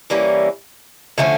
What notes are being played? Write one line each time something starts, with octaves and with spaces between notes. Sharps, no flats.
E3 G3 A#3 C#4
D3 F3 A3 C#4